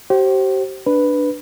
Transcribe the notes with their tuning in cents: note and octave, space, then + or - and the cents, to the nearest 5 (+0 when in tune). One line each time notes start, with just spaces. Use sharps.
G4 -35 C5 +20
D4 +0 B4 +0